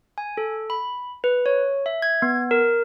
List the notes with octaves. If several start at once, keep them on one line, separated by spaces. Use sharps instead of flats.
G#5
A4
B5
B4
C#5
E5
G#6
B3
A#4